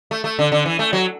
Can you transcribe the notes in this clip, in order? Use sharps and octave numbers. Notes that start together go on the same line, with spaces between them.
A3
A3
D3
D3
E3
A3
F#3